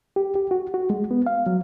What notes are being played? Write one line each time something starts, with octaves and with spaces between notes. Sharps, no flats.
G4
G4
F#4
F#4
G#3
B3
F5
F#3